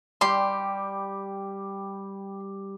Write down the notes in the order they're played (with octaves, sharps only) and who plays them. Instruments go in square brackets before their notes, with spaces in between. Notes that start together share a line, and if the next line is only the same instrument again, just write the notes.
[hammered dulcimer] G3 [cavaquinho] G4 C6